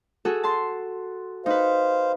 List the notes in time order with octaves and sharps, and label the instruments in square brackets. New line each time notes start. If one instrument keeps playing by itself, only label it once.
[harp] F#4 G#4 A4
A5 C6
[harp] D#4 B4 [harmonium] C5 F5